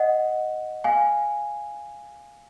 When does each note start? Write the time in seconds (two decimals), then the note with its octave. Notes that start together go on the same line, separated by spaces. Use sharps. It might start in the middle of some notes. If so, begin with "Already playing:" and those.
Already playing: D#5 F#5
0.84 F5 G#5